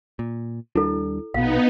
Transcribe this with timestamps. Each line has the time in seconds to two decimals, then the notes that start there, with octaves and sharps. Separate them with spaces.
0.19 A#2
0.75 D#2 G3 D4 E4 A4
1.34 A#1 B2 B3 D#4 F5